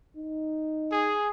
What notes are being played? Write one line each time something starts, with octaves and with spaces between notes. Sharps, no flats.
D#4
G#4